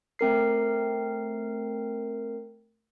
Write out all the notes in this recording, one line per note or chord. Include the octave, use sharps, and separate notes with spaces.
A3 C4 A#4 C7